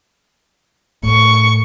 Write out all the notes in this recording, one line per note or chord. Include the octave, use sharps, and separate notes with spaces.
A2 C#6